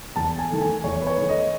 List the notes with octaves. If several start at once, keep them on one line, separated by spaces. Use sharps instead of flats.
E2 A5
G#5
D#3 A3
G#5
E2 C#5
B4
C#5
D#3 A3
D#5